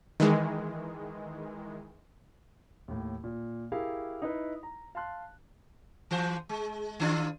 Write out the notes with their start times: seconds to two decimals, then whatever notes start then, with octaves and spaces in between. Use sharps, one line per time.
0.20 D#3 E3 G#3
2.88 D#2 A2
3.24 A#2
3.72 E4 G4 G#4 A#4 F5
4.22 D#4 E4 B4
4.63 A#5
4.95 F5 A5 C6 F#6
6.11 E3 C5
6.49 G#3
7.00 D#3 D4 F4